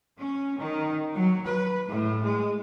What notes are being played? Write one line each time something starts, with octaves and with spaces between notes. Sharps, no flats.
C#4
D#3
F#3
B4
A2
G#3